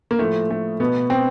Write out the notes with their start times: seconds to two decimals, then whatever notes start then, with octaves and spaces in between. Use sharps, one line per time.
0.11 A#3
0.19 A2 F3 A3
0.50 A3
0.80 B2 B3
1.10 C4